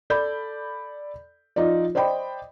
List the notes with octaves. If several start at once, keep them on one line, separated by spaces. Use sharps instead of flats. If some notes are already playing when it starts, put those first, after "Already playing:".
A4 D5 B5 G6
F3 D#4 F4 D5
C5 D5 D#5 G5 B5